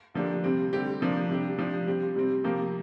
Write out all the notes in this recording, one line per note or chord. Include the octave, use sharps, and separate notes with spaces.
D3 F3 A#3 D4 G4
C3 G3 C4
D3 G3 C4 G4
C3 F3 A#3 D4
C3 G3 D4 G4
C3 F3 D4 G4
G3 C4 G4
C3 G3 C4
C3 F3 A#3 G4